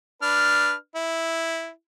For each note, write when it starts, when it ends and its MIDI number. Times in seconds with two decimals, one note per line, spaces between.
0.22 0.73 62
0.22 0.73 71
0.22 0.73 89
0.96 1.69 64